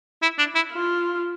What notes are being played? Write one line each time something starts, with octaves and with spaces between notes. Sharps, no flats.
E4
D4
E4
F4